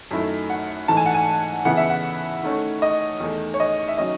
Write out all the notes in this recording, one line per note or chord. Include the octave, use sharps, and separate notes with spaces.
F#2 D#3 A3 E4
F#5
G#2 E3 A3 A5
G#5
F#5
G#5
C#3 E3 B3 E4 F#5
E5
F#5
D#3 A3 C#4
D#5
E2 D#3 A3 D#4
C#5
D#5
E5
D#3 F#3 C#4 D#5